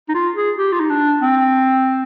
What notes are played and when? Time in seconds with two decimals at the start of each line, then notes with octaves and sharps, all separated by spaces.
0.09 D#4
0.14 F4
0.36 G#4
0.57 G4
0.72 F4
0.80 D#4
0.90 D4
1.21 C4